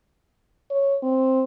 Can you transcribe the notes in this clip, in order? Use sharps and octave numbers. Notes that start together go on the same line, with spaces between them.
C#5
C4